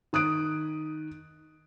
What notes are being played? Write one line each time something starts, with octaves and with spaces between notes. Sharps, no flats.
D#3 D#6 F#6 D7